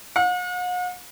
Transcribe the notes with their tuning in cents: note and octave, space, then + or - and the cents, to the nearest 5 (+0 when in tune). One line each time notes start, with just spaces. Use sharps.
F#5 -45